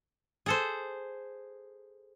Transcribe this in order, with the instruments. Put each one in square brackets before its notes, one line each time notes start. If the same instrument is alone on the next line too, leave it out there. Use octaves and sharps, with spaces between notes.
[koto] G#4 A4 C5